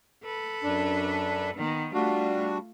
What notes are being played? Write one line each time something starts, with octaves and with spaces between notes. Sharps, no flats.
A4 B4
F#2 D4
D#3 B3
G3 A3 D4 F4 F#4